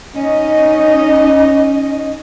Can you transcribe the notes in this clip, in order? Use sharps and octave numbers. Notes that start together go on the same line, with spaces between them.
C#4 D#4 D#5